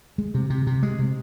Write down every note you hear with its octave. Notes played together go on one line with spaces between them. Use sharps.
G#3
C3
C3
C3
G#3
C3